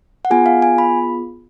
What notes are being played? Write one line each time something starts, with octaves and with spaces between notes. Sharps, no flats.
F#5
B3 F4 G#4 G#5
F5
G#5
B5